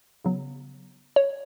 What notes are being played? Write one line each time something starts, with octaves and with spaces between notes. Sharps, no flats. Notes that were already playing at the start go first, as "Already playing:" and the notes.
C#3 F#3 B3
C#5